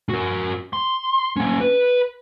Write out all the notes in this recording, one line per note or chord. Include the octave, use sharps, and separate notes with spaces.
F#4 A#4
C6
A#3 C#4
B4